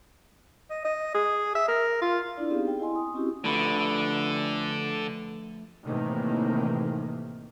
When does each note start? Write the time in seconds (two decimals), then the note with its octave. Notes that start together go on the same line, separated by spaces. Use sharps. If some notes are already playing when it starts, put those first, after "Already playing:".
0.70 D#5
0.84 D#5
1.14 G#4
1.55 E5
1.68 A#4
2.01 F4
2.37 D4 E4 D5
2.50 B3 C4 D#4 G4 G#4 F5
2.65 G#4 G5
2.79 E4 D#5 G#5 C6
2.96 D#6
3.14 C4 C#4 E4 F#4 G4
3.45 D3 F3 A3 B4
5.85 A2 C3 D#3 E3 A#3